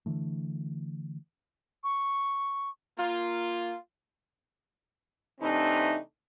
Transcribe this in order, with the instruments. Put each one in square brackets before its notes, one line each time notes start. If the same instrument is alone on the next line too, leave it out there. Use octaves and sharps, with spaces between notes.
[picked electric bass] D3 E3 A3
[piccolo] C#6
[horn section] A#3 F4
[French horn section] C3 E3 A3 C4 D4 D#4